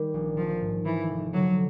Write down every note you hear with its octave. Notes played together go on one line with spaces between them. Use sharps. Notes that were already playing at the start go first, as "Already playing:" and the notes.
Already playing: D#3 G3
A#1
D#3 F3
G#2
E3 F3
F1
D3 F#3